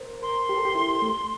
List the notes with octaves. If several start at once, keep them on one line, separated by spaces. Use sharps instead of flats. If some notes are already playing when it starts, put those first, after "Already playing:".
Already playing: A#4 C5
A#4 C6
G4
A4
G4
E4
A3